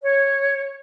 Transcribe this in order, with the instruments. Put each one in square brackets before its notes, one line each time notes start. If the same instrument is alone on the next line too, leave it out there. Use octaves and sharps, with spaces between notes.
[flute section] C#5